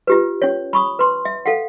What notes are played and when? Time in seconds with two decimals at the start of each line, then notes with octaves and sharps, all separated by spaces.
0.07 F4 G4 B4
0.42 C#4 C#5
0.73 B5 C#6 D#6
0.99 B4 C6
1.25 E5
1.46 A4 F5 F#5